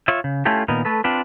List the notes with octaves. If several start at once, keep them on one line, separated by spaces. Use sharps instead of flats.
F4 C#5 E5
C#3
A3 C#4 E4 F4 G4 A4
A#2 D#3 B3 D#4 A#4
A3 A4 B4
C4 D4 F4 B4